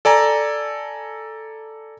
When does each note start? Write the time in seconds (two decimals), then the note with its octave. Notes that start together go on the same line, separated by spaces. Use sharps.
0.05 A4 D5 G#5 A#5